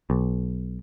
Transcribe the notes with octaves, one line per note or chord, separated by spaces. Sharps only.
B1